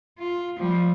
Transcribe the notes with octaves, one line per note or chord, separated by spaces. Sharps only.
F4
F3 G3